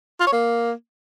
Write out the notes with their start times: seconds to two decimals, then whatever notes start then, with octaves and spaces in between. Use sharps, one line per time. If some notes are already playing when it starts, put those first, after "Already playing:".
0.20 F4
0.27 C#5
0.33 A#3